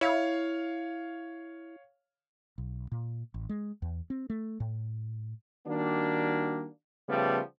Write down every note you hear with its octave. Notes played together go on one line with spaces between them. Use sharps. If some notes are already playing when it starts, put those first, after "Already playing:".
E4 C#5 F5
B1
A#2
A1
G#3
E2
C4
A3
A2
D#3 G3 A#3 D4 F#4
C#3 F3 G3 A3 B3